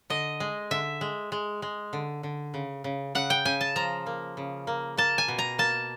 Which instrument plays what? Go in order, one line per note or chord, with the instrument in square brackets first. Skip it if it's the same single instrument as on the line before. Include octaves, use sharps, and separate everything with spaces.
[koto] D3 D#5
G#3
D3 E5
G#3
G#3
G#3
D3
D3
C#3
C#3
C#3 F#5
G5
C#3 G#5
A5
F3 A#5
A#3
C#3
A#3
A#3 A5
G#5
B2
A#5
A#3 A5